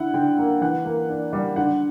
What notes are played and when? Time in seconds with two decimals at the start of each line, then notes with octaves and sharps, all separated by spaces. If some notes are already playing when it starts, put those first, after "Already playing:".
Already playing: D3 E4 F#5
0.14 D3 G5
0.38 A#3
0.61 E3 F#5
0.85 A#3
1.09 D4
1.33 G3
1.56 D3 F#5